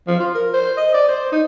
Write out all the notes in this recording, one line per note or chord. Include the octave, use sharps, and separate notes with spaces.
F3
F4
A#4
C5
D#5
D5
C5
D#4